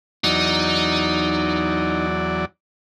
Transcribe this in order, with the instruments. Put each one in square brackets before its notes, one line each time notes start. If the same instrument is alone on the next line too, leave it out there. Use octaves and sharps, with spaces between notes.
[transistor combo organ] E2 F#3 D5 [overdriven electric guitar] D#4